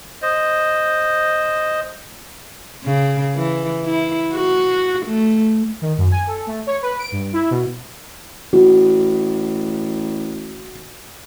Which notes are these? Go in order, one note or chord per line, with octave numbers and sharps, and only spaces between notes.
C5 D#5
C#3
E3
E4
F#4
A3
D#3
F#2
G#5
A4
A3
C#5
B4
D7
G2
E4
B2
A1 F#4